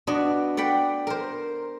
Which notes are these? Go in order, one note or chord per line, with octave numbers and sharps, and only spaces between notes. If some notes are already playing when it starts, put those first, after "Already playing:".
B3 D4 F#4 D#5
D5 F#5 G5 B5
A#4 C5